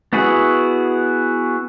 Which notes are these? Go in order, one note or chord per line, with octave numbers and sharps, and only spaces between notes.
B3 E4 F#4 G#4